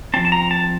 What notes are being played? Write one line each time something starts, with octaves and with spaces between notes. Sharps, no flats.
F3 C4 A5
A5
A#5
A5